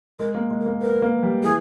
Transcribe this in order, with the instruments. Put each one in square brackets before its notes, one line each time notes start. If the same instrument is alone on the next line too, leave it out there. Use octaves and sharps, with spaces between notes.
[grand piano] G#3 [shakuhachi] A#4
[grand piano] A#3
G#3
[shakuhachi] A#4
[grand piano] A#3
[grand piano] B3 [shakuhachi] A#4
[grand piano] A#3
G3
[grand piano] E3 [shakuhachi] G#4